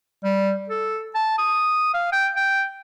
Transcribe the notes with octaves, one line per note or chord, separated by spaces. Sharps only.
G3
A4
A5
D#6
F5
G5
G5